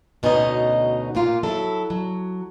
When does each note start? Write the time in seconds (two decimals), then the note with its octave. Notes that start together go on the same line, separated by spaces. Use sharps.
0.23 D2 B2 C#4 D#4 D#5
1.15 A#2 A#3 F4
1.43 F#3 E4 A4
1.90 F#3